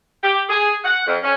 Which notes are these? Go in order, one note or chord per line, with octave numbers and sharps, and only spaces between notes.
G4
G#4
F#5
F2
C#4